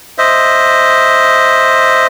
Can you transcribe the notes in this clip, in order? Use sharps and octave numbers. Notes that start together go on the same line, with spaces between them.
C5 D#5 E5